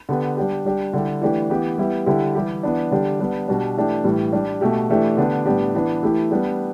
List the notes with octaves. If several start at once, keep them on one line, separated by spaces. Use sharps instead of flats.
D3 B3 G4
G3 D4 G4
G3 D4 G4
D3 G3 E4 G4
E3 A3 D4 G4
E3 B3 G4
G3 B3 E4 G4
D3 G3 E4 G4
E3 G3 E4 G4
E3 B3 D4
D3 G3 D4 G4
G3 B3 D4
B2 G3 D4
E3 A3 D4 G4
A2 E3 G3
G3 D4 G4
B2 A3 G4
E3 A3 D4 G4
D3 B3 D4 G4
A2 G3 B3 D4 G4
E3 B3 D4
E3 A3 E4 G4
G3 B3 D4 G4